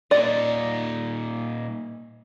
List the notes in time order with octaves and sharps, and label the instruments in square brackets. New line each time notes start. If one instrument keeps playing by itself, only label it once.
[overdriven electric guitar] A#2 D#4 [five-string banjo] D5